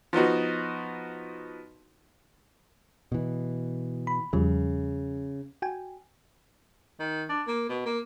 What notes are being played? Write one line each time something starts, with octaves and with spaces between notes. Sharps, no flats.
F3 B3 D#4 F#4
B2 E3
B5
E2 C#3 F3 G3
F#4 G5 G#5
D#3
D4
A#3
B2
A#3